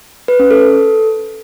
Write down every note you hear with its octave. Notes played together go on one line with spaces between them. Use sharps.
B4
C#4
A4